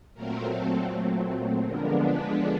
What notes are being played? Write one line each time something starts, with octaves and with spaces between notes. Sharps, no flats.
A#2 F#3 A3 C4 A#4
A4
D3 F3 G#3 B3 D4 A#4
B4